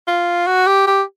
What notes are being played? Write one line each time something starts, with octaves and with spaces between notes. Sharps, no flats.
F4
F#4
G4
G4